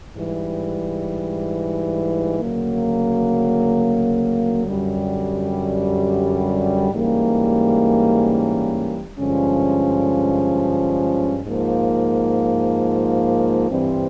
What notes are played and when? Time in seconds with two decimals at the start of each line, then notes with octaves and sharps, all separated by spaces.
0.14 G#2 E3 G3
2.39 D2 C#3 F#3 A#3
4.66 F#2 D3 G3
6.91 G#2 E3 G3 A#3 C#4
9.18 G2 D3 F3 G#3 C#4
11.43 G#2 F3 A#3
13.69 G2 E3 G3 C4